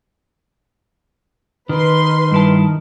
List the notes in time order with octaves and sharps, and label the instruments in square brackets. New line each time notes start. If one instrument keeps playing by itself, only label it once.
[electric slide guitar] D#3 [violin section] B4 C6
[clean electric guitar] G2 E4 A5